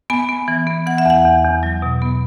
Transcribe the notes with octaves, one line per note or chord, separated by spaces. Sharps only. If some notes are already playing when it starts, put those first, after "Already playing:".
B3 G#5
B3
E3
B3
E3 F#5
E5
E2 F#5
E2
E2
F#3
B2
B3